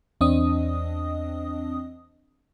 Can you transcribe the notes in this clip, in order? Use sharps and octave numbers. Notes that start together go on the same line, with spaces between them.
E2 C4 D4 D#5 D#6